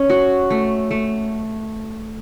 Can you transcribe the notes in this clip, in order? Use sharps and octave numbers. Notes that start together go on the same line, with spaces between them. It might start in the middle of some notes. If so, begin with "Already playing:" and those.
Already playing: C#4
F#4
A3
A3